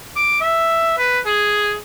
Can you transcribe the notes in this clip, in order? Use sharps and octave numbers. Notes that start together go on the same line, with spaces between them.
D6
E5
B4
G#4